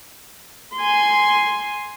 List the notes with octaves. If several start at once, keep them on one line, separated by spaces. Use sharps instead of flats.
G#5 C6